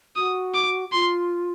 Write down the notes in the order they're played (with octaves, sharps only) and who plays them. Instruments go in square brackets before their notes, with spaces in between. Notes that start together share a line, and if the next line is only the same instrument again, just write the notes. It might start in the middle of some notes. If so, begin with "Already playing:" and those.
[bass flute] F#4 [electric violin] D#6
[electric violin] D6
[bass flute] F4 [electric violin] C6